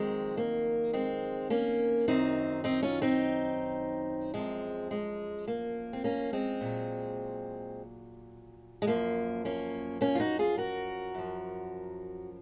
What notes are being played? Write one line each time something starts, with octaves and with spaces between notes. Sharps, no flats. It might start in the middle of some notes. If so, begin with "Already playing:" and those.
Already playing: F2 D#3 F#3 G#3 C4
A#3
G#3 C4
A#3 C#4
F#2 D#3 F#3 C4 D#4
C4 D#4
C#4 F4
C4 D#4
F#2 F3 G#3 C4
G#3
A#3
C4
A#3 C#4
G#3 C4
A#2 F#3
G#3
F#2 F3 A#3
A#3 C#4
A#3 C#4
F4
D#4 F#4
F4 G#4
F#4 A#4
F#2 F3